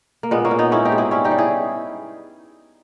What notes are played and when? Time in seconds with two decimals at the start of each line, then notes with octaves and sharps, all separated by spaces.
0.23 A#3
0.31 A#2 G#3 B3
0.45 A#3 C#4
0.51 A#2
0.59 B3 D#4
0.71 G#2 C#4 E4
0.85 D#4 G4
0.92 G#2
0.98 E4 G#4
1.11 G3 C#4 E4
1.24 D#4 G4
1.31 G3
1.38 E4 G#4